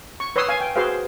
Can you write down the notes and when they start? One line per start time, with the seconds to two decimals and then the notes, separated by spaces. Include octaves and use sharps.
0.20 C#6
0.36 B4 C#5 C6 D#6 E6
0.49 F5 G#5
0.61 G5
0.76 F#4 G#4 B4 C5 F5